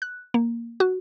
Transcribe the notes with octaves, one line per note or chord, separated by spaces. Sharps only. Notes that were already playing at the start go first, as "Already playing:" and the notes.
F#6
A#3
F#4